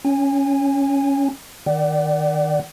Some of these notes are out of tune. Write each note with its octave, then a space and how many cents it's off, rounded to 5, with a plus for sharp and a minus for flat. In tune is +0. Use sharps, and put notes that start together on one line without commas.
C#4 +5 G#5 -15
D#3 +0 D5 +0 F#5 +40